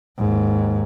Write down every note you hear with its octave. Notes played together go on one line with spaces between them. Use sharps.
D#2 G#2